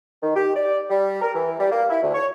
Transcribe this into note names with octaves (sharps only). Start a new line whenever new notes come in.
D#3
G4
D5
G3
A#4
E3
G3
A#3
E4
D2
C#5